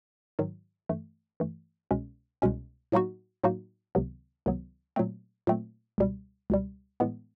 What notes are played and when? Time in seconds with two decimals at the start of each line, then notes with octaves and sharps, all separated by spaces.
0.39 G#2 D#3 F#3
0.89 G2 E3 A3
1.40 G2 E3 A3
1.91 C2 B2 G#3 C#4
2.42 C2 B2 G#3 C#4
2.92 A2 F#3 A#3 D#4 F#4
3.44 A2 F#3 A#3 D#4 F#4
3.95 C#2 C3 D#3 F#3 B3
4.46 C#2 C3 D#3 F#3 B3
4.96 A#2 F#3 A3 C4
5.47 A#2 F#3 A3 C4
5.98 C#2 B2 G3
6.50 C#2 B2 G3
7.00 A2 E3 G#3 B3